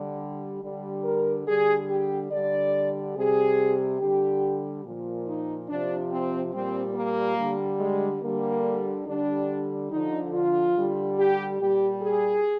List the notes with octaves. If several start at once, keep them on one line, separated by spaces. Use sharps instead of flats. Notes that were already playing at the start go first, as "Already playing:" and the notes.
Already playing: D3 G3
D3 G3
A#4
D3 G3 G#4
G4
D3 G3 D5
C3 G3 G#4
D3 G3 G4
A#2 F3
D#4
C3 F3 D4
C4
A#2 G3 C4
A#3
D3 G3
G#3
D3 G3 A#3
D3 G3 D4
D3 F3 D#4
F4
D3 G3
G4
A#2 G3 G4
G#4